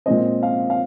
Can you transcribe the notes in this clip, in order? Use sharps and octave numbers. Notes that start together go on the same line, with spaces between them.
A#2 G#3 C4 D#5
F5
F5